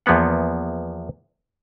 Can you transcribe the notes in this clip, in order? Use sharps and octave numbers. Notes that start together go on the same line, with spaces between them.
E2 F3 A#3 B3 F#5